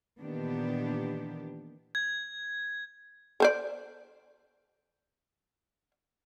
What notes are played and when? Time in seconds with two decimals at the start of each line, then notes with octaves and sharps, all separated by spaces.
0.20 A#2 D#3 E3 B3 D4 G4
1.95 G#6
3.40 A4 C5 D5